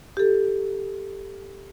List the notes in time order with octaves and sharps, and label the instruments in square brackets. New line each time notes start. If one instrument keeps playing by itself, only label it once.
[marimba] G4 A4